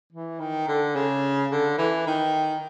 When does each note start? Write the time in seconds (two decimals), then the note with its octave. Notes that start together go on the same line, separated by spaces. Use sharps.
0.13 E3
0.40 D#3
0.68 D3
0.95 C#3
1.51 D3
1.78 E3
2.07 D#3